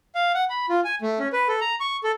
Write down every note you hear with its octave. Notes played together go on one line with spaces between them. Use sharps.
F5
F#5
B5
F4
G#5
A3
C#4
B4
A4
A#5
C#6
A4